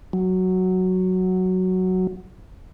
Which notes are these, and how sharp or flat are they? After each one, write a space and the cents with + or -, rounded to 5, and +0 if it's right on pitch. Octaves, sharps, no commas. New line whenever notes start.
F#3 +0